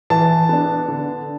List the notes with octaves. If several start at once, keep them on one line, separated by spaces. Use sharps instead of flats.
E3 A5
B3 D4
D3